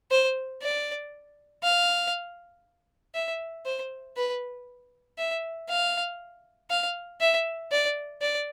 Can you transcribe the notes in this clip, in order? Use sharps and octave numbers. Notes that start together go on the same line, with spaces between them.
C5
D5
F5
E5
C5
B4
E5
F5
F5
E5
D5
D5